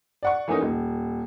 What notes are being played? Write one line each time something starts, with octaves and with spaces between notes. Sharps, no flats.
D5 F#5 C#6
E3 A3 A#3 C#4 D#4
D#1